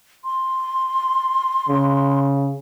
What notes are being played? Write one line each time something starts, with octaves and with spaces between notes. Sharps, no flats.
C6
C#3